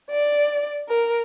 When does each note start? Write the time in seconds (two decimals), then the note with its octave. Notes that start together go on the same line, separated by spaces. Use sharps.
0.11 D5
0.89 A#4